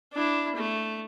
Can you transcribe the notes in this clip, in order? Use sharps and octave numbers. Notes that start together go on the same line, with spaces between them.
D4 E4
A3